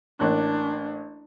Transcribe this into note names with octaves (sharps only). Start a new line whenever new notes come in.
A1 A#3 D4 F#6